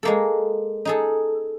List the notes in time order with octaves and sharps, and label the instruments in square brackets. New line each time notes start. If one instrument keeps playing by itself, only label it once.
[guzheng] G#3 A#3 A4
D#4 G#4 A4